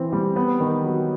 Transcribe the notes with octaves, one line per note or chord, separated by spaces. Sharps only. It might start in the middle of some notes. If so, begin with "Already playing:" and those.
Already playing: E3 C4
G3
B3
D#3
F#3